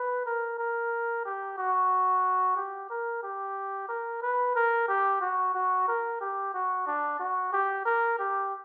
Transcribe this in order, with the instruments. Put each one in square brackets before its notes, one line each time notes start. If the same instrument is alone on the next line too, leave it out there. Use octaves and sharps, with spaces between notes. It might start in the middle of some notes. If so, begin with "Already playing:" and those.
Already playing: [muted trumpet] B4
A#4
A#4
G4
F#4
G4
A#4
G4
A#4
B4
A#4
G4
F#4
F#4
A#4
G4
F#4
D4
F#4
G4
A#4
G4